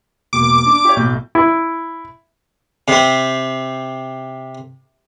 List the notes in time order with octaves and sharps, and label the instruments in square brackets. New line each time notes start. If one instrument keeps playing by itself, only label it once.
[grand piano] E1 A#3 [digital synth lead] D6
[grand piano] D4
G4 C#5
B1 A2 G6
[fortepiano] E4
[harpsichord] C3 C4